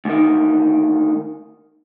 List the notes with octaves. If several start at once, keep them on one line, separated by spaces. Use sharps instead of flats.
D2 D#3